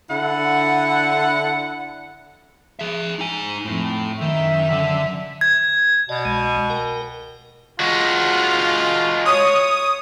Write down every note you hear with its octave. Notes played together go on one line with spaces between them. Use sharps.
D3 E4 F#5
G#4 E5
D#4 G#5
F2 A2 C4
F#2 D#3 E5
D3
G#6
B2 D5 D#5
C2 G#3
A#4 G5
G#3 F4 F#4
C#5 D#6